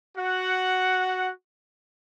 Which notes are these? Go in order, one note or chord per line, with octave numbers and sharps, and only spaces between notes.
F#4 F#5